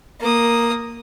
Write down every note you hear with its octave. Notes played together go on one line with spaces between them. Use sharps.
A#3 D#6